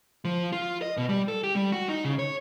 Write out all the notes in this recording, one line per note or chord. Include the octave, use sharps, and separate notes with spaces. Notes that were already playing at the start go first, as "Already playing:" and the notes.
F3
F4
D#5
B2
G3
A4
G4
G3
F#4
D#4
C#3
C#5